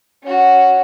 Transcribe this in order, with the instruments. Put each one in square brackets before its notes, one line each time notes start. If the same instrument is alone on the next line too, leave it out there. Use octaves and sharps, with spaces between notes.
[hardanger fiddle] C#4 F#4